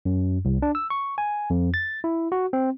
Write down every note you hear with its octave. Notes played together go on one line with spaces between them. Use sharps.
F#2
C2
D4
E6
C#6
G#5
F2
A6
E4
F#4
C4